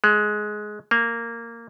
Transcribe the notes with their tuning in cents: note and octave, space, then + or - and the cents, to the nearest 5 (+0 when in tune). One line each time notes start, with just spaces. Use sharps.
G#3 +15
A#3 -10